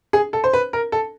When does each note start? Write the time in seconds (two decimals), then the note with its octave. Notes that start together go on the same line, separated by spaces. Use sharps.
0.13 G#4
0.33 A4
0.44 C5
0.53 B4
0.73 A#4
0.92 A4